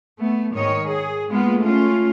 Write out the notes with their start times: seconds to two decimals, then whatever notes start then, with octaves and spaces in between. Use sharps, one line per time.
0.19 A3 B3
0.54 G#2 D#3 C#5 D#5
0.84 G#4
1.29 G#3 A#3 B3 F4
1.59 A3 C#4 F4